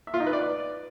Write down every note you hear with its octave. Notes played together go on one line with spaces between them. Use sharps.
E5
F4
D#4
B4
D5